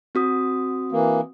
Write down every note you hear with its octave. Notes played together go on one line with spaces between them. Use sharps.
C4 F#4 D#6
E3 A#3